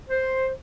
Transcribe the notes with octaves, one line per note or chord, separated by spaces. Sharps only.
C5